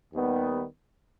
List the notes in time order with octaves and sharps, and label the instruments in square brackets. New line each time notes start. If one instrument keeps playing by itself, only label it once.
[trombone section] D#2 D#3 G3 B3